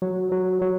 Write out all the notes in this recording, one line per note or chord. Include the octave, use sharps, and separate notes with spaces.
F#3
F#3
F#3